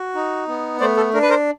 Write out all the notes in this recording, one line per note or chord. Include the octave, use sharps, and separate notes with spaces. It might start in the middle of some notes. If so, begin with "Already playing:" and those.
Already playing: F#4
D#4
B3
A3 C5 D5
A4
D4 A#4
B4
A#4 C5